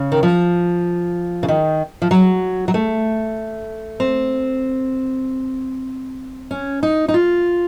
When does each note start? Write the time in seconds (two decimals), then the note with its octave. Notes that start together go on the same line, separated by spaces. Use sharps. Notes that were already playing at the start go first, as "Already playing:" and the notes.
Already playing: C#3
0.12 D#3
0.23 F3
1.43 C#3
1.48 D#3
2.02 F3
2.11 F#3
2.68 F#3
2.74 A3
4.00 C4
6.51 C#4
6.83 D#4
7.08 D#4
7.14 F4